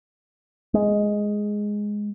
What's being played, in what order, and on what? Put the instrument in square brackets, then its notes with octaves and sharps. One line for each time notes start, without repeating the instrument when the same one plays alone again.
[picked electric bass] G#3